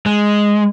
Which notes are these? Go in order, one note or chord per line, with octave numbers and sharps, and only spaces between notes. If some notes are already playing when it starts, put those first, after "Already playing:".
G#3